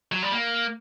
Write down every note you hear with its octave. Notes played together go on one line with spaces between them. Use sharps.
F#3
G3
A#3